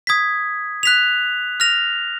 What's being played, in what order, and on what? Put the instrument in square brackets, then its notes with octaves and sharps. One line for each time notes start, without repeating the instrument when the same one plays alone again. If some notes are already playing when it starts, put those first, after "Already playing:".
[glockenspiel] D#6 G#6 B6
F#6 B6 F7
F6 A#6 F7